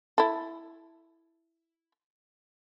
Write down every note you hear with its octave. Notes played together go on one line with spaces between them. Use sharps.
E4 A4